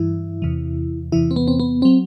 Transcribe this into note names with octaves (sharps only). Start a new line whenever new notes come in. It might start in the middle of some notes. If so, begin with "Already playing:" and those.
Already playing: G2 E3 E4
E2 C3 E3
E2 C3 E3 E4
C4
B3
C4
B3
F#3 C4